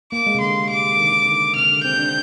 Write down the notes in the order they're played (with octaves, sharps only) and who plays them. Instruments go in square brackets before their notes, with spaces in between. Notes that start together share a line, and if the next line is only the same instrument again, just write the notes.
[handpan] A#3 [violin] D6
[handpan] G#3
C3
[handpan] D3 [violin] C6
[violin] D6
[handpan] D3
D#3
D#3
D3
[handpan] C3 [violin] F6
[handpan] D3
[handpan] C4 [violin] G6
[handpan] D4